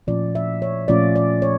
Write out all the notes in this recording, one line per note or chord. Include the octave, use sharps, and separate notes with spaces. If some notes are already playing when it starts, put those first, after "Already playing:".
A#2 F3 A3 C#4 F4 D5
E5
C#5
A#2 F3 A3 C#4 F4 D5
D5
C#5